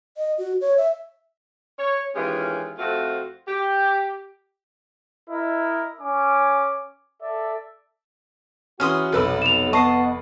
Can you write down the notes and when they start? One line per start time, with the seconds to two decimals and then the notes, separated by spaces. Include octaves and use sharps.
0.17 D#5
0.38 F#4
0.61 C#5
0.77 E5
1.79 C#5
2.15 D#3 E3 G#3 C#4 F4 G4
2.79 F2 A3 C4 F4 F#4
3.48 G4
5.29 E4 A#4 D#5
6.01 C#4 G#5 D6
7.22 A4 D5 E5
8.80 E3 C#4 F#4 G#4 C6 D#6 F6
9.13 F1 B1 B4 E6
9.42 E7 F7
9.73 B3 D#5 A5 C#6 D#6 C7